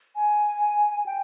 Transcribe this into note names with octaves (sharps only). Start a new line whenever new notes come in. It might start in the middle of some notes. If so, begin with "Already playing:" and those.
G#5
G5